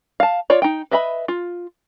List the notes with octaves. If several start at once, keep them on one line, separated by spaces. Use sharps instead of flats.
F5 A5
F4 C#5 D5
D#4 G5
B4 D#5 E5 A#5 B5
F4